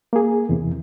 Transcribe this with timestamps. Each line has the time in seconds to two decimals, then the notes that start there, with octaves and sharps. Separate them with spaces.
0.13 A#3 G#4
0.49 E2 C3 E3